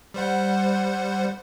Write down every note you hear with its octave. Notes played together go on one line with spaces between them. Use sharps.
G3 C5 F#5